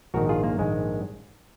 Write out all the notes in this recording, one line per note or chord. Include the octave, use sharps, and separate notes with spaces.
A#1 G#2 D#3 F#4 A#4
F4 G#4
A#3
A#1 G#2 D#3 G#3